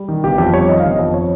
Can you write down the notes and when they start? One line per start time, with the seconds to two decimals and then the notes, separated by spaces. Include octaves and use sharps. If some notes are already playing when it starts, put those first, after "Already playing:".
Already playing: G3
0.08 D#3
0.24 G1 G4
0.38 F2 G4
0.53 G3 C#5
0.69 D#3 D#5
0.80 F5
0.84 G1
0.91 D#5
0.99 F2
1.14 C#5